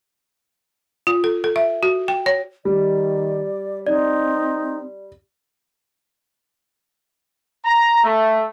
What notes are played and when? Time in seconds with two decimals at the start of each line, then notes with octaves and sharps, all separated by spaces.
1.07 F4
1.24 A4
1.44 A4
1.56 E5
1.83 F#4
2.08 G5
2.26 C#5
2.65 D#3 G3 D5
3.87 C4 D#4 D5
7.65 A#5
8.04 A3